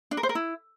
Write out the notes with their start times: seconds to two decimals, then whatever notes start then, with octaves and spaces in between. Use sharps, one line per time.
0.11 D4
0.17 A#4
0.23 C5
0.29 A#4
0.35 E4